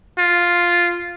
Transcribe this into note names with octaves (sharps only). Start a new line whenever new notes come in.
F4